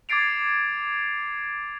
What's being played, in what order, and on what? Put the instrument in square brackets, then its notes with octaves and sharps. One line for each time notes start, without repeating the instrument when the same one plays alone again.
[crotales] D6 G#6 A6 C7 D7 F7